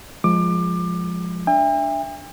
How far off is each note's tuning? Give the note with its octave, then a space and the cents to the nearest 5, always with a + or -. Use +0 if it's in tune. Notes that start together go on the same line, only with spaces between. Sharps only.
F3 +10 G#3 +0 D6 +25
D4 +0 E5 +10 G5 +45